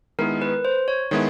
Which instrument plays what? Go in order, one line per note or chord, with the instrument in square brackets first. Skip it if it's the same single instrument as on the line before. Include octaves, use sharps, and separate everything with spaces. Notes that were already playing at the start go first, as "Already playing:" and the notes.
[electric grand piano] D#3 G#3 B3 E4 [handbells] A#4
[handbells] B4
C5
C#5
[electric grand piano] D#3 G#3 B3 E4 [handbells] C#5